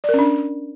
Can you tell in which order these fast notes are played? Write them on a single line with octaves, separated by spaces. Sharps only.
D5 A#4 C#4 D4